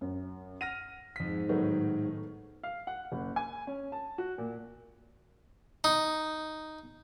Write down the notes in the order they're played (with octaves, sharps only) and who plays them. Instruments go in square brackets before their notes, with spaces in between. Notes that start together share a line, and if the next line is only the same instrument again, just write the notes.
[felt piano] F#2
[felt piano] F#5 [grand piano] F6 A#6 D#7
[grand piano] F2 B6 [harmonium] G#2
[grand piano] A2 D#3 [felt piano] F#3 A3 B3
[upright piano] F5
F#5
F#1
G#5
C#4
A5
F#4
A#2
[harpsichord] D#4